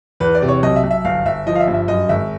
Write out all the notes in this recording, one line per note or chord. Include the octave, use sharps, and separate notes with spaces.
E2 B4
D5
C3
C#5
B1 D#5
E5
B1
E5
G1 F5
G1 E5
F3 D#5
F5
E5
G2
E5
F#2 D#5
G#1 E5